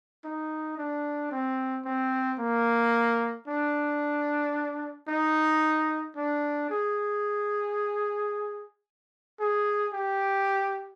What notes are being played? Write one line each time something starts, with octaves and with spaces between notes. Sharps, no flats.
D#4
D4
C4
C4
A#3
D4
D#4
D4
G#4
G#4
G4